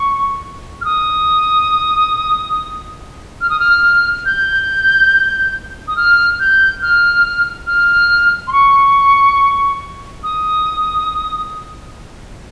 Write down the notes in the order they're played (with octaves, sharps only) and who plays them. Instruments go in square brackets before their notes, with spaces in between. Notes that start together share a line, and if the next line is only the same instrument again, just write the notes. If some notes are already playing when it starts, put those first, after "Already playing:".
Already playing: [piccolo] C#6
F6
D#6
F6
D#6
F6
G6
D#6
F6
G6
F6
F6
C6
C#6
D#6